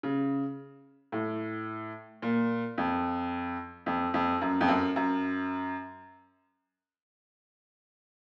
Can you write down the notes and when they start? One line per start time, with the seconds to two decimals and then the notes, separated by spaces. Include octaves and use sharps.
0.03 C#3
1.12 A2
2.22 A#2
2.78 F2
3.86 F2
4.14 F2
4.41 F#2
4.61 F2
4.68 F#2
4.96 F#2